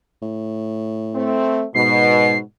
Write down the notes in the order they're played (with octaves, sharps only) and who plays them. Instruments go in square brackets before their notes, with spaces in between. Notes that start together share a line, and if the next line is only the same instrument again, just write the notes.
[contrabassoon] A2
[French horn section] A3 C4
[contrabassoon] G#2 [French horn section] B2 [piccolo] C7